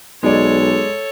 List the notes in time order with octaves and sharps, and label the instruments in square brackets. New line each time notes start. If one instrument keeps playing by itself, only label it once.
[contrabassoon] B1 [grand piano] G#3 D5 [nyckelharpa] A4 C#5